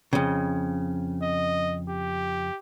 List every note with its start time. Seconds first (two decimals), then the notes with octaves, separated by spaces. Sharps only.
0.13 F2 C#3
1.23 D#5
1.89 G4